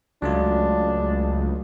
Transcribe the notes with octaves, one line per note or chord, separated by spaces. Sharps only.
C#2 F#3 A3 D4 F4